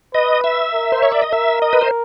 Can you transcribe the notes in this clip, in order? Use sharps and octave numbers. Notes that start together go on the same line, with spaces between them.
B4 D#5
E5
A#4
C5
C#5
D5
D#5
A#4 E5
D#5
B4
C5